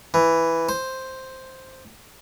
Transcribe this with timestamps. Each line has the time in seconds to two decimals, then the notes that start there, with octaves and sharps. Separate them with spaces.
0.14 E3
0.69 C5